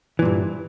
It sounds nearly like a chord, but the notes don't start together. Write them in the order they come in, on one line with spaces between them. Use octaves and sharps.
E3 A#2 G2